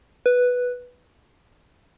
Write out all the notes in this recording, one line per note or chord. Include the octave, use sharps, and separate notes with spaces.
B4